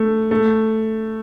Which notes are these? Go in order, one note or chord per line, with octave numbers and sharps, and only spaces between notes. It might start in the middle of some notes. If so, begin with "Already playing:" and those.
Already playing: A3
A3